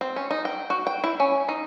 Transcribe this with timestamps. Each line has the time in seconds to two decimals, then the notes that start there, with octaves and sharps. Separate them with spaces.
0.01 C4
0.16 C#4
0.31 D#4
0.45 G5
0.70 F#4
0.87 G5
1.04 E4
1.20 C#4
1.49 D#4